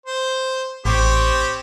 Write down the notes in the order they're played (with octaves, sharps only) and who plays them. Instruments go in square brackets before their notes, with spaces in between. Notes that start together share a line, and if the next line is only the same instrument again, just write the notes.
[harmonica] C5
[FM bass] A1 [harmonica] C4 G4 C#5